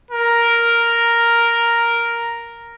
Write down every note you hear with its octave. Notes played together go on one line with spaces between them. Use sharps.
A#4